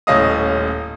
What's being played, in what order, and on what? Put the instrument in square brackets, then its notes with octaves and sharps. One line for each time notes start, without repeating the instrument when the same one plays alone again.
[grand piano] D#1 A2 C#4 D#5 F5 D#6